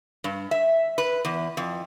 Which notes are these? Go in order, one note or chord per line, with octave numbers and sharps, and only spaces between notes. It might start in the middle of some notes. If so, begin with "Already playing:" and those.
G2
E5
B4
E2
F2